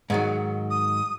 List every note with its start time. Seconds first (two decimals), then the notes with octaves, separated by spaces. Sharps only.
0.10 G#2 D#3 F#3
0.70 D#6